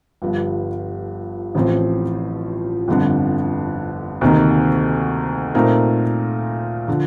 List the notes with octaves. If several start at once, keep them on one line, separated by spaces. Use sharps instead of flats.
G1 G2 F3
A1 A2 F3 C4 F4
G1 F2 D3
D2 C3 D#3 A#3
A#2 A3 C4 D#4 A#4
D3 F3